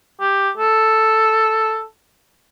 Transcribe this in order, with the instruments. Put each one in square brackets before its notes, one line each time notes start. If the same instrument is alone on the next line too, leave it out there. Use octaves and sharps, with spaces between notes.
[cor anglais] G4
A4